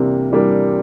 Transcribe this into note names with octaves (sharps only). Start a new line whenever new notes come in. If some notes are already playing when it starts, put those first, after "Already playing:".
Already playing: C3 E3 G3 A#3 D4
E3 G3 A#3 D4